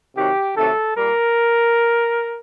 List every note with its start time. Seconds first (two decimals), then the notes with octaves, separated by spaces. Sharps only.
0.16 C3 D#3 F#3 G4
0.56 C3 D#3 F#3 A3 A4
0.96 A#2 G3 A#3 A#4